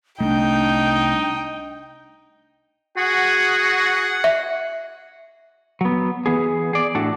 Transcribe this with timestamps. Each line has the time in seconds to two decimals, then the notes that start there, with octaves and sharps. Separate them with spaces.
0.21 C2 A3 D4 D#4 G5
2.97 F#4 G#4 F#5
4.24 E5
5.81 F#3 B3
6.26 E3 B3 G#4
6.73 G#4 D5
6.95 A2 D4 F#4 A4